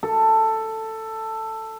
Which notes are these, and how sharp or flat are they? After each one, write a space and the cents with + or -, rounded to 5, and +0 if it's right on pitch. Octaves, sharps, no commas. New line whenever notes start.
A4 +10